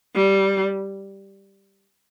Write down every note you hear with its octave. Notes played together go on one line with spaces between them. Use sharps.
G3